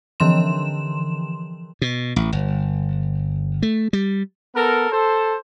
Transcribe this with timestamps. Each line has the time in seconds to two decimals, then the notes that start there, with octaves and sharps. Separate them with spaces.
0.20 D3 E3 F3 C6 E7
1.82 B2
2.16 A1
2.32 G1
3.62 A3
3.93 G3
4.55 B3 A4 A#4
4.91 A4 C5